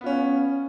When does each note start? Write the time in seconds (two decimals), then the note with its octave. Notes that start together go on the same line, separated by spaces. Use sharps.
0.01 B3
0.04 F4
0.06 C#4